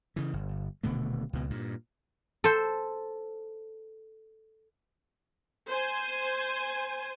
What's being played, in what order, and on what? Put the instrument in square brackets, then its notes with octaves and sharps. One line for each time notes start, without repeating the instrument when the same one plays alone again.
[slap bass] C#3 E3
G1
D#1 B2 D3 A3
C#2 B2
G2 A#2
[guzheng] A4 C5
[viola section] C5 G#5